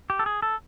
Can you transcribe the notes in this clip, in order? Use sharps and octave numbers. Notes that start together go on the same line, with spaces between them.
G4
A4
G#4
A4